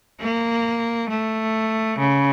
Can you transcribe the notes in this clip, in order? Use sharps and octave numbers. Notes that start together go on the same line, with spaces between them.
A#3
A3
C#3